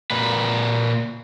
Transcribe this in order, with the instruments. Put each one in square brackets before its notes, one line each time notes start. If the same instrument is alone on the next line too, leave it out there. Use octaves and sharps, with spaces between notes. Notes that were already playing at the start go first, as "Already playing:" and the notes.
[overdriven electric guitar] A#2 B4